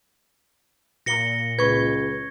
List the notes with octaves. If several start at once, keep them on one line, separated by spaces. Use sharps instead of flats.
A#2 A#6 C#7 G7
C#2 B4 C#6 G#6